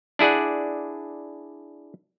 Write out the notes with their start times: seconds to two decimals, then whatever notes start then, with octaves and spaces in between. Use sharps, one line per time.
0.19 D4 E4 G#4 D5 F#5